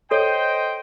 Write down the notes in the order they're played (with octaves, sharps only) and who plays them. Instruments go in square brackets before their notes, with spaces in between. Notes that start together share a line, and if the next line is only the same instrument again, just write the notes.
[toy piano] A4 C#5 [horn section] C5 D#5 G5